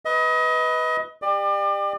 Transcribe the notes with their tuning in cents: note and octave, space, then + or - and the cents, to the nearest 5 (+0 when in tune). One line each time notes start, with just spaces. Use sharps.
B4 +0 D#5 +30
G4 +25 D5 +35